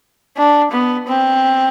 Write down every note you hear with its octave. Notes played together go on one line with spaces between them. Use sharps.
D4
B3
C4